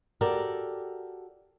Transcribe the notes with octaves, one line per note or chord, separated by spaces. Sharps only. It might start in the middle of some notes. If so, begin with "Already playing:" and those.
F#4 G4 A4 A#4 D5